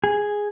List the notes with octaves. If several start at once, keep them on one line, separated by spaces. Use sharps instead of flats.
G#4